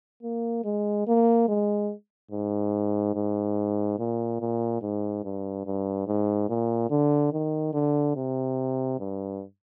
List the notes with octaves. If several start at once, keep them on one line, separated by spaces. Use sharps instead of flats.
A#3
G#3
A#3
G#3
G#2
G#2
A#2
A#2
G#2
G2
G2
G#2
A#2
D3
D#3
D3
C3
G2